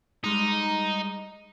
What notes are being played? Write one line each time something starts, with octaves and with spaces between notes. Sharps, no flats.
G3 G#3 D#4 A#5